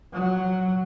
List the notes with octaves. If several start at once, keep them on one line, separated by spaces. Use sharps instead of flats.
F#3